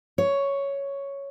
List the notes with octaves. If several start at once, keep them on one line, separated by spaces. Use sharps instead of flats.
C#5